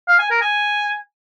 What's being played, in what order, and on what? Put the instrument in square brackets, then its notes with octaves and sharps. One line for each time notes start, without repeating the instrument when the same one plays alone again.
[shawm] F5
G#5
A#4
G#5